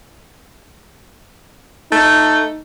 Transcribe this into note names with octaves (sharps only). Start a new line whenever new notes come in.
A3 D#4